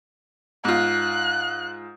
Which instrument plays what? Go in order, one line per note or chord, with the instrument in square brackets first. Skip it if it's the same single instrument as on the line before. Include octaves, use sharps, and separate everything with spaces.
[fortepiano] G#2 F4 [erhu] F#6